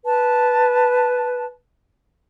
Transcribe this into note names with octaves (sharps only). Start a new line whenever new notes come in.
B4 A5